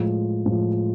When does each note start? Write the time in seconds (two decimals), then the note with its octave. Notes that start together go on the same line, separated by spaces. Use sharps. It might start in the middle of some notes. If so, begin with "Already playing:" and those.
Already playing: A2 F3 G#3
0.45 A2 F3 G#3